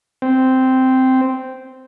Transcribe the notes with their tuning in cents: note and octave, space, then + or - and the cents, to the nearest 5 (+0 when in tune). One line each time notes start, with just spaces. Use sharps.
C4 -5